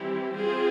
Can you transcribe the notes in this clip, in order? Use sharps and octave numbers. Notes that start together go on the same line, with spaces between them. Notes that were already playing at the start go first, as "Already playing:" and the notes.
Already playing: E3 G3 C4 E4 G4
C4 F4 G#4 C5